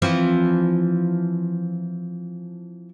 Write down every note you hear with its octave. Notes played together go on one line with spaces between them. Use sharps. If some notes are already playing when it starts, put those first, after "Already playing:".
E3 F3 C4